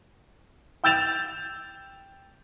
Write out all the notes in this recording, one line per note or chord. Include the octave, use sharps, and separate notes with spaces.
G5 E6 G6 A6 E7 F7